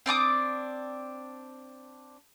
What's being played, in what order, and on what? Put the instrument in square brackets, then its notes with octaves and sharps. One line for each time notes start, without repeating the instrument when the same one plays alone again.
[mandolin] C4 D4 D6 D#6